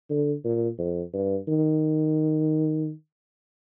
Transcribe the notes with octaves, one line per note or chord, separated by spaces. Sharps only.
D3
A#2
F2
G2
D#3